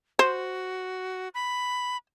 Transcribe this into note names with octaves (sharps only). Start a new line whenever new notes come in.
F#4 C5
B5